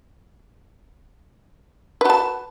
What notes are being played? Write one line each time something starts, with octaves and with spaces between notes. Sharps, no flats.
F#4 B4 A5